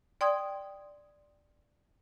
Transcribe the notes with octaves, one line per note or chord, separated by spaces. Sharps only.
D5 G5 C6 D#6 G#6